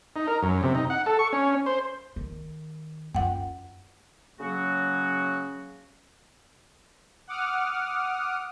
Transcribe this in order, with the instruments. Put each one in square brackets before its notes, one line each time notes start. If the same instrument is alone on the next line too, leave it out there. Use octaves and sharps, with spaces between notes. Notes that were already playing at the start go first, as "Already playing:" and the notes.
[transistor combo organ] D#4
A#4
F#2
C3
D#4
F#5
A4
C#6
C#4
C5
[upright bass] D#3
[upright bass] F#2 F4 [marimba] F#5 G5
[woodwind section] C#3 F#3 A#3 F#4
[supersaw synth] F#5 D6 D#6 F6